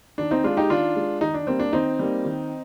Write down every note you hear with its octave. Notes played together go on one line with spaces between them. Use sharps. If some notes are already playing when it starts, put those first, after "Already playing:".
D#3 D4
C4 D#4
G#3 D4 F4
D#4 G4
D#3 D4 F4
G#3
D#3 D#4
D4
G3 A#3 C4
D4
D#3 C4 D#4
G3 A#3
D#3